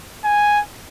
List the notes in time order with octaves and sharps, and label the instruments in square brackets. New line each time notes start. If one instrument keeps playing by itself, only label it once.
[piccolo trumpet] G#5